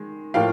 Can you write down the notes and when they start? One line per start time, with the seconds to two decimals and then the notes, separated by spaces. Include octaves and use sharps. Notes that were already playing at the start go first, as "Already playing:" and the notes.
Already playing: D#3 G#3
0.34 A2 F3 A#3 F5 G5